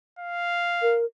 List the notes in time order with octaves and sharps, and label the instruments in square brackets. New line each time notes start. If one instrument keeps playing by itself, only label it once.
[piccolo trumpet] F5
[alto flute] A#4